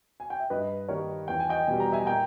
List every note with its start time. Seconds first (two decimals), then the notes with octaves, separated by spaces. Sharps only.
0.20 G#5
0.30 G5
0.40 E5
0.50 G2 B4 D#5
0.88 D#3 G3 A#3 D#4 A#4 C#5
1.28 E2 G5
1.40 G#5
1.49 D#5 G5
1.67 B2 G3 G#5
1.80 A#5
1.92 E5 G#5
2.06 A#2 G5 A#5